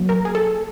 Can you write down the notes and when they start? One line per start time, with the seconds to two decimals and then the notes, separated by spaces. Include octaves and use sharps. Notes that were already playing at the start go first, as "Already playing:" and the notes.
Already playing: F#3 A#3
0.09 A#4
0.25 G#4
0.35 A4